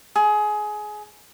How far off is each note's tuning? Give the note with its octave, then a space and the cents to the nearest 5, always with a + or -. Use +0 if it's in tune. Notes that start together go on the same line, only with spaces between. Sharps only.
G#4 +20